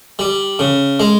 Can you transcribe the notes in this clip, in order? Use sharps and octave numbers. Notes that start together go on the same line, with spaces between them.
G3
C#3
G#3